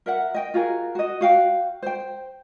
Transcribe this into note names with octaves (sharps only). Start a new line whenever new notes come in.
A#4 E5 F#5
D#5 G5
F4 F#4 G#4 A#4
F#4 D#5
F#4 F5 G5
C5 G5